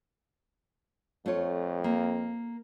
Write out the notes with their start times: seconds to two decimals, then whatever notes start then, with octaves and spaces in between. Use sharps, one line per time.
1.26 F2 A3 F4 C#5
1.84 A#3